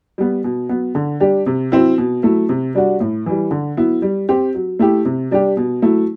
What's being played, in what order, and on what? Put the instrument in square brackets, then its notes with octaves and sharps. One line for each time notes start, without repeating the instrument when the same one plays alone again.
[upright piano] G3 B3
B2
F#3 B3
D3
G3 D4 G4
C3
F#3 C4 E4
B2
F#3 A3 E4
C3
G3 D4 F#4
A2
E3 G3
D3
F#3 B3 E4
G3
C4 G4
F#3
A3 E4 G4
C3
G3 D4 G4
B2
F#3 A3 E4